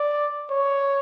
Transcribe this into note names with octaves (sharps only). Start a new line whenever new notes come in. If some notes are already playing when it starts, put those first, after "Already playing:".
Already playing: D5
C#5